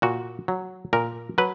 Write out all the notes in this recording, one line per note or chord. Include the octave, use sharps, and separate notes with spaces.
A#2 F#4
F#3
A#2 A#4
F#3 B4